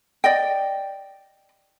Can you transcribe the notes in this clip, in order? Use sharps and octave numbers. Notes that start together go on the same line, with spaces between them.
D5 D#5 G5